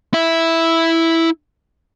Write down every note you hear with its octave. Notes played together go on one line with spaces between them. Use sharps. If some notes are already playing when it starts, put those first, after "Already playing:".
E4 E5